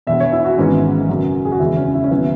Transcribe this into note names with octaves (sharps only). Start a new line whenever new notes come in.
E1 E2 B2 E5
C#5
E4
F#4
G#1 G#2 E3 G#3 B3 C#4
F#2 C#3 F#3
G#4
F#4
F#1 E2 C#3 G#3 B3 E4
C#4
E4
C#4
G#1 F#3 B3 E4